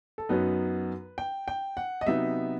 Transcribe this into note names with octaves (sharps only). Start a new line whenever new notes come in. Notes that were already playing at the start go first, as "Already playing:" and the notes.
A4
F#2 F#3 B3 D#4 B4
G5
G5
F#5
D#5
C3 F#3 B3 D#4 E5